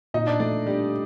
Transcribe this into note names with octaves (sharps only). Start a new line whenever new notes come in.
A#2 D#4 D#5
D4 D5
A3 D4 D5
G3 D4 G4